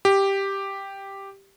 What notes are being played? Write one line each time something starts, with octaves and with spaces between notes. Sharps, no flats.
G4